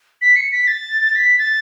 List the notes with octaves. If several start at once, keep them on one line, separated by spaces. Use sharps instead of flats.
B6
C#7
B6
A6
B6
A6